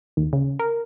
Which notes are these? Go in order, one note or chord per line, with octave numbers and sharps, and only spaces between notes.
D#2
C#3
A#4